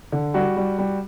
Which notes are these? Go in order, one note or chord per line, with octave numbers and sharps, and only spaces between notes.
D3
G3 F#4
G3
G3